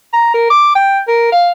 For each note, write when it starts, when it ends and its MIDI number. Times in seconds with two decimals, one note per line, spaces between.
0.13 0.31 82
0.34 0.48 70
0.50 0.71 86
0.75 1.01 79
1.08 1.32 70
1.32 1.51 77